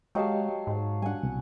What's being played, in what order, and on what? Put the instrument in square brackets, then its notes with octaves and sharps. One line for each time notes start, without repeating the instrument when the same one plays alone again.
[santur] F#3 F5 A5 [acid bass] G#3 [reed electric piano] G4 D#5 G5
[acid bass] G#2
[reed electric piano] G3 D4 [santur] F#5 G#5
[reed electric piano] C2 B2